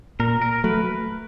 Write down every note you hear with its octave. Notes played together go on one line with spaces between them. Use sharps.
A#2 A#4
A#4
F#3 A3 B4